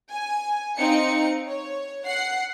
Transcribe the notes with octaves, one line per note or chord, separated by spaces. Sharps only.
G#5
C4 D#4 F5 C#7
C#5
F#5 C7